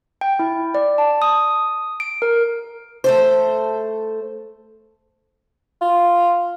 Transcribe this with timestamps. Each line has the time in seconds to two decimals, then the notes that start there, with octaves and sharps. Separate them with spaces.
0.21 G5
0.39 E4
0.75 D5
0.98 A5
1.22 D#6
2.00 D7
2.22 A#4
3.04 A3 A4 C5
5.81 F4